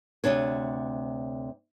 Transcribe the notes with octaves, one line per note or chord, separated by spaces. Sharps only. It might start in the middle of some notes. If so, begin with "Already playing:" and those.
D2 G2 C3 D4 C#5